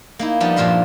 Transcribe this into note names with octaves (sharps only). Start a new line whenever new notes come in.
A#3 D#4 E4
F3 G3 B3 D4 D#4
G2 A#2 F3 A#4 E5 C6